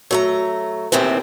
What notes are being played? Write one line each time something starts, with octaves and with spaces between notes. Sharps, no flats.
F#3 A3 A#5
D#2 A2 C3 E3 C4